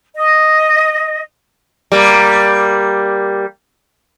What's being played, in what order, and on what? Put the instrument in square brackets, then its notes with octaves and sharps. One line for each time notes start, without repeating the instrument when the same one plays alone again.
[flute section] D#5
[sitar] G3 A#3